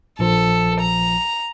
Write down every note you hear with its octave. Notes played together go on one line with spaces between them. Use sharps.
A#1 F3 A4
A#5